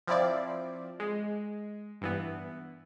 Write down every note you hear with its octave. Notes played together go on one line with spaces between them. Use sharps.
F3 C4 E4 D5
G#3
G2 E3 B3